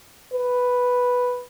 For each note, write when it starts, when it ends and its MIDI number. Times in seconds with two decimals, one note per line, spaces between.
0.33 1.45 71